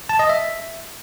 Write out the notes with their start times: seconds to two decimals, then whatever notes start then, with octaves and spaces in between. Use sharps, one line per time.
0.09 A5
0.19 D#5
0.29 E5